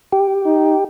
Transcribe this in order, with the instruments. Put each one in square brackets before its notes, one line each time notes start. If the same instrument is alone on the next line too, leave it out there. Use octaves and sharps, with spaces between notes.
[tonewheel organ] G4
[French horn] D#4